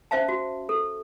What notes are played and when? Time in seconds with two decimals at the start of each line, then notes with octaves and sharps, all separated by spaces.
0.11 C#4 C5 E5 F5 A5
0.28 F#4
0.69 A4